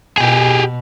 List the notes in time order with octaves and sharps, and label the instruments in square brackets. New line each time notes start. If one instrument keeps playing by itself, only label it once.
[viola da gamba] B2 [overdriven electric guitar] G4 G#4